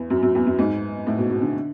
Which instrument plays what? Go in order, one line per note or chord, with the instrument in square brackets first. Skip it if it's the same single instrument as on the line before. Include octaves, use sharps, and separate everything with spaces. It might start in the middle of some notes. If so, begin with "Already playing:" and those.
Already playing: [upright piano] E2
F#2
F#2
E2
F#2
G#2
A2
B2
B2
D3